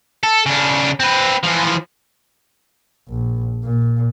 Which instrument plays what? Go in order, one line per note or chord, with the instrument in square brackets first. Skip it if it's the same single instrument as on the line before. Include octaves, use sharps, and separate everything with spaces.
[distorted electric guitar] A4
C#3 D4
C4 B4
E3 F3
[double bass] A#1
A#2